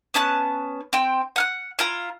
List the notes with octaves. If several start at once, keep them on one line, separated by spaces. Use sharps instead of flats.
B3 C#4 A5 F#6
C4 G5
F#5 F6 F#6
E4 F4 A#5